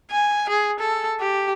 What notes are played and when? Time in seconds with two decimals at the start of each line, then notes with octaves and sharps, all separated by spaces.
0.11 G#5
0.49 G#4
0.80 A4
1.21 G4